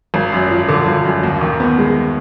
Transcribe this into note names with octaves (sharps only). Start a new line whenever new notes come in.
G#1
F#2
F3
D3
G#1
F#2
D#2
D#3
B3
G#3